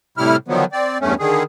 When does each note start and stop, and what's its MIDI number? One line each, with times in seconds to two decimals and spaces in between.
0.18 0.36 45
0.18 0.36 48
0.18 0.36 55
0.18 0.36 64
0.18 0.36 89
0.48 0.65 50
0.48 0.65 51
0.48 0.65 53
0.48 0.65 54
0.48 0.65 59
0.72 0.98 60
0.72 0.98 74
1.01 1.14 40
1.01 1.14 43
1.01 1.14 57
1.01 1.14 61
1.19 1.43 50
1.19 1.43 51
1.19 1.43 68